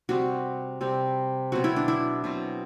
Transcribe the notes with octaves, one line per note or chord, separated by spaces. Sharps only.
C3 G3 C4 F#4
C3 G3 C4
B2 F#3 C4 F#4
E4
D4
E4
B2 F#3 C4